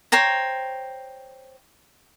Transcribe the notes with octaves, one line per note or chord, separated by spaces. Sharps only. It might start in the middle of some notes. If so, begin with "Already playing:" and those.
C5 C#5 G5 A#5